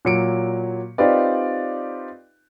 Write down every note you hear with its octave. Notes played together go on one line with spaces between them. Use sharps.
A#2 F#3 C#7 D7
C4 D#4 F4 G4 B4 D5